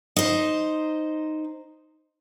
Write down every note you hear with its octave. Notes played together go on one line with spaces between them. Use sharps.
D#4 C5